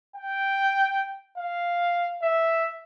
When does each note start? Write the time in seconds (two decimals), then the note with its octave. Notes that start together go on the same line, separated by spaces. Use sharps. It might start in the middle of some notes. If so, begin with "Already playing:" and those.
0.16 G5
1.37 F5
2.22 E5